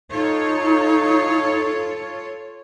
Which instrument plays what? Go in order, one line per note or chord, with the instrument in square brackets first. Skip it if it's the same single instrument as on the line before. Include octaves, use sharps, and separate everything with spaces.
[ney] D#4 [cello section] F4 A4 C#5